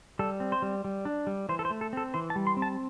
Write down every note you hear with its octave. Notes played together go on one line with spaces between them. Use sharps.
G3 A4
C4
C5
G3
G3
D4
G3
E3 C5
A4
C5
A3
A4
C4 A4
E3 C5
A5
G3
C6
C4
A5